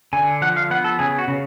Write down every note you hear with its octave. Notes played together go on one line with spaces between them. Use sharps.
D3 G#5
F3 F#5
F5
B3 F#5
A4
C#3 G#4
F#4
C#3